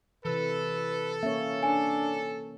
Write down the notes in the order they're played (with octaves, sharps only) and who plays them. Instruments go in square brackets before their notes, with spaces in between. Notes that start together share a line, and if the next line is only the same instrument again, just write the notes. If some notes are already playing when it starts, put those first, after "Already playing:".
[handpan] C3 E3 [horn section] A4 [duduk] B4
[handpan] A#3 C#4 C#5 [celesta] E5
[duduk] D4 [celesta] G#5